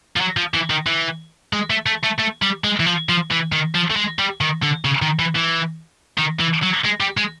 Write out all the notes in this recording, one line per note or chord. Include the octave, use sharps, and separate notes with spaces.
F3
F#3
F3
E3
D#3
E3
G#3
A3
A3
A3
A3
G3
G#3
E3
F3
F3
E3
D#3
F3
A3
G#3
G3
D#3
D3
C#3
D#3
E3
E3
D#3
E3
F#3
G#3
G3
G#3